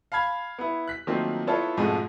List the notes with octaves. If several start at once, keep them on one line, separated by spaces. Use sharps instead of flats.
F5 A5 B5 G#6
B3 E4
F#6 B6
D#3 F3 F#3 A3 A#3 C4
B3 E4 F4 A4 C#5 A5
F2 G#2 B2 F3 G#3 A3